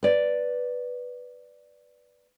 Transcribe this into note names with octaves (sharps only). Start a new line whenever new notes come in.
B4 D5